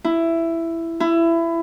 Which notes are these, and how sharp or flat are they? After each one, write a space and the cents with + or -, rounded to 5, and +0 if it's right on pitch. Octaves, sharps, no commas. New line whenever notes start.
E4 +10
E4 +20